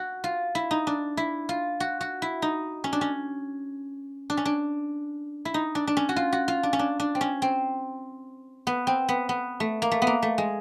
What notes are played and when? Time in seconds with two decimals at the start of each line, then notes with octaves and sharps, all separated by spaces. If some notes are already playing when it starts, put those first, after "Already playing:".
Already playing: F#4
0.24 F4
0.55 E4
0.71 D#4
0.87 D4
1.17 E4
1.49 F4
1.80 F#4
2.01 F#4
2.22 E4
2.42 D#4
2.84 C#4
2.93 D4
3.01 C#4
4.30 D4
4.37 C#4
4.45 D4
5.45 E4
5.54 D#4
5.75 D4
5.87 D4
5.97 C#4
6.09 F#4
6.16 F4
6.32 F#4
6.48 F4
6.63 D4
6.73 C#4
6.79 D4
7.00 D4
7.15 C4
7.21 C#4
7.42 C4
8.67 B3
8.87 C4
9.09 B3
9.29 B3
9.60 A3
9.82 A#3
9.91 A3
10.02 B3
10.07 A#3
10.22 A3
10.38 G#3